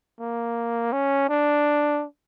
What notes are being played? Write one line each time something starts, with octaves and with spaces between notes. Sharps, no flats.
A#3
C#4
D4